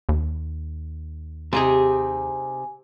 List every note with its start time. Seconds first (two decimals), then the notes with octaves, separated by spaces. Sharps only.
0.09 D#2
1.53 C3 D#4 G4 G#4 G#5